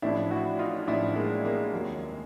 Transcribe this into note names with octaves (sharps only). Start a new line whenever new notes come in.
A1 A2 F3 D4 E4
E4 F#4
D#4 F4
A1 A2 F3 D4 E4
G#3 A#3
G#3 A#3
F1 D#2 D#3 F#3